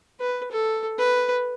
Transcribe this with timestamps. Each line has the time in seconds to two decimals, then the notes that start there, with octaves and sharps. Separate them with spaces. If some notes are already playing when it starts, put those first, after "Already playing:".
0.20 B4
0.51 A4
0.98 B4